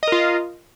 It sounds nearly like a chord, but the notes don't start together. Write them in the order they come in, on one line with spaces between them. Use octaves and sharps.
D#5 A#4 F4